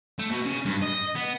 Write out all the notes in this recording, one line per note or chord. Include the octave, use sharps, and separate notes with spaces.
A3
B2
C#3
G2
D#5
B3